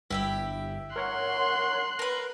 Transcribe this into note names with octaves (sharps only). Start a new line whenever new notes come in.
G1 E4 G4 E5
A#4 C#5 F#5 C6 F#6
A#4 B4